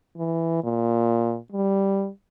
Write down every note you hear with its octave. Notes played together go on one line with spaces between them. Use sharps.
E3
A#2
G3